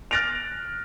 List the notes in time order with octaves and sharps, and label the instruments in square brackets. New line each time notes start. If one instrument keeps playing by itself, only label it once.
[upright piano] F6 F#6 A6 A#6 D7 F7